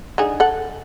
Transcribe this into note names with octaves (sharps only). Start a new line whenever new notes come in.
D3 D#4 G#4
A4 F#5